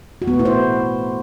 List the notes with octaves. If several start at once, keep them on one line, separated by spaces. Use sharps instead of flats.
F#4
B3
A3
E4
C5